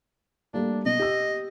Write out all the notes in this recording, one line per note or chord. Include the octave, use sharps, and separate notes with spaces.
G3 A3 A#3 D4
B2 D#5
G4 E6